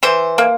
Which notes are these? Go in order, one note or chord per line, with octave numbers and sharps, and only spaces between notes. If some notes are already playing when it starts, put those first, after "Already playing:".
E3 C5
A#3